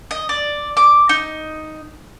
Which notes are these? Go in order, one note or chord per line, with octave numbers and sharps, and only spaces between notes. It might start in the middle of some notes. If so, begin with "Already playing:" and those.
D#5
D5
D6
D#4